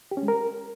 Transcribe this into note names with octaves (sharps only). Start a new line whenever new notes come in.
G4
C#4
G#3
A#4